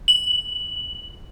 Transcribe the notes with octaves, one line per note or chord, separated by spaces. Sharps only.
F#7